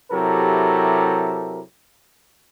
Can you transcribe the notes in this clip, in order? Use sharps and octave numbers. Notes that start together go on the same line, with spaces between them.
C3 F#3 E4 G4 A4 A#4